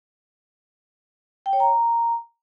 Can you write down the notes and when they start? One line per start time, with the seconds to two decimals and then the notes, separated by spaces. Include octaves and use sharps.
1.46 G5
1.53 C#5
1.60 A#5